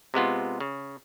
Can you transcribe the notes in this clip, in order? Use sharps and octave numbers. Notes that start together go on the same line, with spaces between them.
C3 G#3 B3 F4
C#3